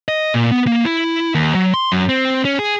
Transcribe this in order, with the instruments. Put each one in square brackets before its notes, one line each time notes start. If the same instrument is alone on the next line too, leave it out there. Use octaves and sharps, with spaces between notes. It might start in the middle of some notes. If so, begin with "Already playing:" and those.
[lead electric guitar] D#5
A#2
B3
A#3
E4
D#2
F#3
C6
F#2
C4
C#4
G#4